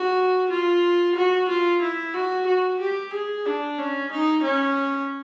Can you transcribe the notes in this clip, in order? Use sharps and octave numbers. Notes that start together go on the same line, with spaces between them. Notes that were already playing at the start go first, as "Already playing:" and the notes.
Already playing: F#4
F4
F#4
F4
E4
F#4
F#4
G4
G#4
D4
C#4
D#4
C#4